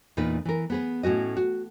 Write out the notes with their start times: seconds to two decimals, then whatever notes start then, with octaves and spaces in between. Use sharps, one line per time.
0.17 E2 A#2 D#4 B4
0.45 E3 A#4
0.70 B3 G#4 B4
1.03 A2 C#4 F#4 D#5
1.37 F#4